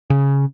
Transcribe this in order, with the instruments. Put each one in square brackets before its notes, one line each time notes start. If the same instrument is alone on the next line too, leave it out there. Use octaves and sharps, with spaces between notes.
[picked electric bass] C#3